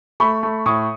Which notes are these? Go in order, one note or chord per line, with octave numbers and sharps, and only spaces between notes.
A3 B5 C#6
A3
A2 C#6 D#6